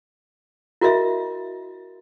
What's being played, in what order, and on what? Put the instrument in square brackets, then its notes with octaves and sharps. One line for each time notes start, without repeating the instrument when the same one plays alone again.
[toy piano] E4 F#4 A#4 D#5 E5